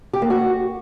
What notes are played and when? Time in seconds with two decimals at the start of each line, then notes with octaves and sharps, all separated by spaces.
0.13 G4
0.22 A#3
0.30 F#4